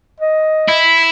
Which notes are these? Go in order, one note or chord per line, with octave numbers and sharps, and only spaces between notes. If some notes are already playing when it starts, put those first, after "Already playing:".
D#5
E4